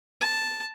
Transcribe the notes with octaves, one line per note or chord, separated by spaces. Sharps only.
A5